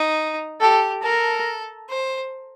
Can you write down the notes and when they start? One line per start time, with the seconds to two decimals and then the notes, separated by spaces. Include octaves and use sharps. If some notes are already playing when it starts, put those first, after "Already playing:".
Already playing: D#4
0.61 G4 A4
1.03 A4 A#4
1.89 C5